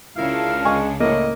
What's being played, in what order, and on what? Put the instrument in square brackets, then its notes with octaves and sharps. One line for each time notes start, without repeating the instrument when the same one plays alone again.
[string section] C#2 C#3 D4 [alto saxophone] E4 [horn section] F4 A#4 F5
[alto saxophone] G#3 [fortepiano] G#5 C#6
[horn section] A2 [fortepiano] A#3 [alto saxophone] D#5